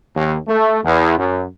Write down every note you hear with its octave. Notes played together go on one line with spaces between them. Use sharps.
D#2
A3
E2
F#2